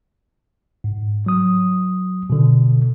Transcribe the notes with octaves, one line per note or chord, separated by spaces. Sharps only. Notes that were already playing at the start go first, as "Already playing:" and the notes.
G#2
F#3 D#6
B2 D3